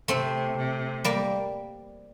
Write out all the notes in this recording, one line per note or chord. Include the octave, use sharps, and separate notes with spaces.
C3 A3 C4
C3
G3 A#3